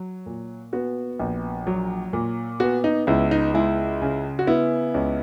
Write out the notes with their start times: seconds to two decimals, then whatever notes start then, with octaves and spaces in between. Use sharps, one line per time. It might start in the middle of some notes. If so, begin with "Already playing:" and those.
Already playing: F#3
0.26 A#2
0.73 B3 F#4
1.19 A#1
1.67 F#3
2.13 A#2
2.60 B3 F#4
2.84 D#4
3.07 C#2 E4
3.31 D#4
3.54 G#3 E4
4.02 C#3
4.39 F#4
4.47 B3 E4
4.94 C#2